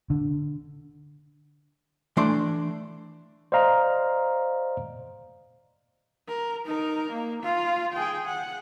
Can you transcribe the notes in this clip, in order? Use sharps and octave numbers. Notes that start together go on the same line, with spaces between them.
D3
E3 A3 D4 D5 C6
C5 D5 D#5 F5 A#5
A#4
D#4 A#4
A#3
F4 F5
G#4 G5
F#5